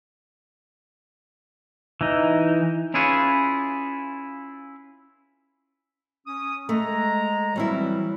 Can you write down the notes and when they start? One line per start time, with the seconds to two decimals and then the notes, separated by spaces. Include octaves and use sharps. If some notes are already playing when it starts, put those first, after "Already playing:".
2.01 E3 D#4
2.94 C#4 E4 F4 G#4 B4 C#5
6.27 C#4 D#6
6.69 G#3 A3 A#5
7.56 E3 F#3 G3 C4 E4